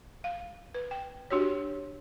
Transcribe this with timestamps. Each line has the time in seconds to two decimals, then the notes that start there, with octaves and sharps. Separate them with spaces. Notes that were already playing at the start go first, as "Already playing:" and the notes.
0.24 F5
0.74 B4
0.91 G5
1.31 D4 F#4 G4 C#5